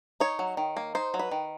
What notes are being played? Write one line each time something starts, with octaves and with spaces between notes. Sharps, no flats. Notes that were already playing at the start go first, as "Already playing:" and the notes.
D#4 C#5
F#3
D#3
A#3
D#4 C5
F#3
B4
D#3